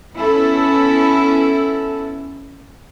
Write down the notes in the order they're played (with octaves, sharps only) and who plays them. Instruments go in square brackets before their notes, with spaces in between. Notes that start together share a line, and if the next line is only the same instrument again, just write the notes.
[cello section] B3 C#4 E4 A4